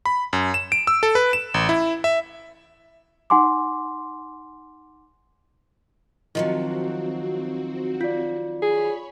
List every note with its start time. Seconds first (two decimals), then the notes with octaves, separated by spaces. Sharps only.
0.06 B5
0.33 F#2
0.54 E7
0.72 D7
0.87 E6
1.03 A4
1.15 B4
1.33 E7
1.54 A1
1.69 E4
2.04 E5
3.30 D#4 F#5 G#5 C6 D6
6.35 D#3 F3 F#3 C4 F#4
8.01 F4 D5
8.62 G#4 C#5 B5